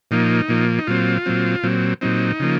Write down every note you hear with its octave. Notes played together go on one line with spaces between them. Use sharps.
A#2 F3 A#3 D#4
A#2 F3 A#3
D#4
A#2 F#3 C4 F4
A#2 F#3 C4
A#2 F#3 C4
A#2 F#3 C4 D#4
C#3 F3 A#3